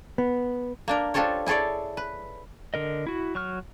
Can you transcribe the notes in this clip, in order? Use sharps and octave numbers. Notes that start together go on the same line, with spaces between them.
B3
A#3 D4 A#4
D4 F4 G4 A4 C5 C#5
E4 G#4 A4 C#5 D5
B4
D3 A#4 D#5
E4 F#4
F#3 C#6 F6